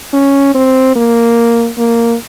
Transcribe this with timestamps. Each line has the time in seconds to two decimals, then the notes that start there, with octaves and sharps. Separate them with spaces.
0.13 C#4
0.55 C4
0.96 A#3
1.78 A#3